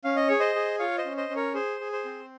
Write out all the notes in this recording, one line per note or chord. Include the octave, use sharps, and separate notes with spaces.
C#4 F5
D#5
G#4 C#5
C5 D#5
G#4
F4 C#5 F5
C5 D#5
C#4
C5 D#5
C#4
A#4 C#5
G#4 C5
G#4
C5
C4